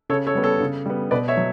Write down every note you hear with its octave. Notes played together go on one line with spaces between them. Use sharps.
C#3 A4 C#5
A4 C#5
G3 B3
A4 C#5
C#3
G3 B3
B2 B4 D5
C#5 E5
F#3